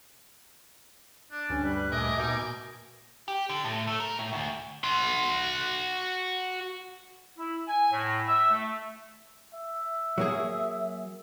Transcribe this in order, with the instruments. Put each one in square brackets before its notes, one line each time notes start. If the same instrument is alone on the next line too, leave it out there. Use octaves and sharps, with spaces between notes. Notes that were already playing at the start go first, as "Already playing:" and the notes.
[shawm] D4
[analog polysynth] D2 G2 [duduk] C#4
[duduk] G3 [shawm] B4
[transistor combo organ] A#2 G#5 D6 [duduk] A3 [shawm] D#5
[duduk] B2 [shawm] D#4
[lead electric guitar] G4
D3
A2
A3
A#4
A2
D2
[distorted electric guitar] F#4 C6
[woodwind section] E4
G#5
A2
E5
A3
[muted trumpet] E5
[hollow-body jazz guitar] F#3 A#3 G#4